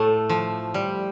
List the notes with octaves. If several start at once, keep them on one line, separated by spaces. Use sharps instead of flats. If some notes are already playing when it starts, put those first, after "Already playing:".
Already playing: A2 A3
F3
G3